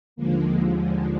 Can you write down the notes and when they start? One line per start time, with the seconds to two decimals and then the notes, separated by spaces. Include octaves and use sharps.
0.16 D#2 D3 F3 G#3 A#3